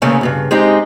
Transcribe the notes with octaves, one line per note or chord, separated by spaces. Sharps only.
E2 C#3 A3 A#3 C#5 G#5
E2 G2 C#3
G#3 C4 D#4 G4 G#4